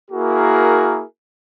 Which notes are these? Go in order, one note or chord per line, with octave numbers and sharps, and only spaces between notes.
A#3 E4 F#4 G#4 A#4